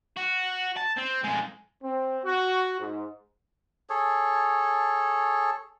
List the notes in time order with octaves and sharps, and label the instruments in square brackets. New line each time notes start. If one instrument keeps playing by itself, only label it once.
[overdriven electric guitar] F#4
A5
C4
F2 G#3
[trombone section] C4
F#4
G#2
[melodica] G#4 A4 C#5